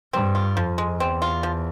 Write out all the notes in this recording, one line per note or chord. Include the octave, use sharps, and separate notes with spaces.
G2 C4
F4
F2 F3
G#3
E2 C4
F4
F3